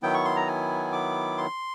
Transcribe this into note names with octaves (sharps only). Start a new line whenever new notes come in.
D#3 F#3 B3 E4 G5
C#6
C6
A#5
G#5
D6
C6